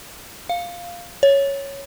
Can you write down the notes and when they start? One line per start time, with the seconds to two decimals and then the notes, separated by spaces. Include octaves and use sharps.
0.49 F5
1.23 C#5